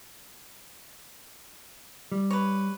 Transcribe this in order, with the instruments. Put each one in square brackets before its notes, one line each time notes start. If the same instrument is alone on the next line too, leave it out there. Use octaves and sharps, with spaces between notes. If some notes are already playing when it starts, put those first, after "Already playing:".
[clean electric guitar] G3
[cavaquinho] B4 C#5